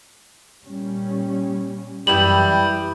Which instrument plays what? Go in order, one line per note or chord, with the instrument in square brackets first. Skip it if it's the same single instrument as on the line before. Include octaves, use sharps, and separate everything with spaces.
[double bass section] A#2 G3 C#4
[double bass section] F#2 E3 [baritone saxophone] G3 [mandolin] B3 E4 G5 [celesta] F#7